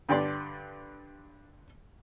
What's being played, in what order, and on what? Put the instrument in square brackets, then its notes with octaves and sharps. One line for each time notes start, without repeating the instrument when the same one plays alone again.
[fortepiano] G2 D3 G4 D5 C6